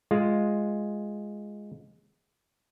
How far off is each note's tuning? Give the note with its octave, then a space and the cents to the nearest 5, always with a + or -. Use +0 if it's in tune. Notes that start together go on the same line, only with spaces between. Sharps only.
G#3 +0 F4 +0